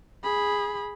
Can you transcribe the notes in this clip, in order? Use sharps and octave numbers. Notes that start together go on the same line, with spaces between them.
G#4 B5